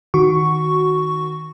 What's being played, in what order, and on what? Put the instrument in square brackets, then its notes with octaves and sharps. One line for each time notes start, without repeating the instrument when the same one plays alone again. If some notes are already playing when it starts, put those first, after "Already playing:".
[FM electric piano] D#3 F#4 C#6